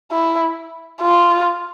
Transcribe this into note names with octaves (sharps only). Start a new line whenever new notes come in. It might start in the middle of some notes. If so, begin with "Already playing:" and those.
E4
F4